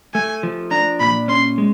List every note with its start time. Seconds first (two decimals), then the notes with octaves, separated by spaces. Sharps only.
0.14 A3 G#5
0.43 F3
0.71 D4 A#5
1.00 A#2 B5
1.28 C#4 C6
1.58 G#3